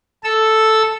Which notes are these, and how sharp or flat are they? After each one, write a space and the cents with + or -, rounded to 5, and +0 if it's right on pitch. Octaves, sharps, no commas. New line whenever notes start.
A4 +0 E6 +0